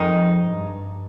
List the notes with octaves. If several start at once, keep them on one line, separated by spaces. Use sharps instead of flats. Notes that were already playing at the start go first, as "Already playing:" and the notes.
Already playing: F2 D#3 G#3 D#4
G2